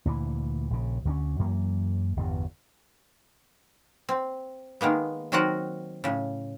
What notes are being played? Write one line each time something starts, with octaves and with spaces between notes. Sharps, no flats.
D2 A#2 E3
A#1 C#3
D2 D3 C#4
F#2 E3 A#3
G1 E2 G2
C4
D#3 G#3 A#3 B3
D#3 F#3 C4 F#4 A#4 F#5
A2 C#3